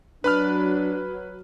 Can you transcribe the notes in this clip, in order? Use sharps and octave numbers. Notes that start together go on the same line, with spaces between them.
F#3 D4 B4 B5 F6